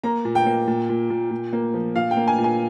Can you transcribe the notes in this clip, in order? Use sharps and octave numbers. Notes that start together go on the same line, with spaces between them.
A#3 A#5
A#2
G5
A#3
A#2
A#2
A#2
A#2
A#3
F3
A#2 F5
G5
A#3
G#5
A#2
G#5